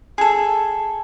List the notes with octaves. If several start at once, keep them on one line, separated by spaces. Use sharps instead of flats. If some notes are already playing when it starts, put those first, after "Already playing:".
G#4 A4